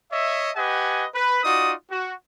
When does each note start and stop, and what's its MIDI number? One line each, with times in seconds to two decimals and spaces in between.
0.11 0.50 73
0.11 0.50 75
0.11 0.50 76
0.56 1.05 67
0.56 1.05 71
0.56 1.05 75
0.56 1.05 78
0.56 1.05 80
1.14 1.43 71
1.44 1.72 63
1.44 1.72 65
1.44 1.72 66
1.44 1.72 74
1.44 1.72 87
1.91 2.12 66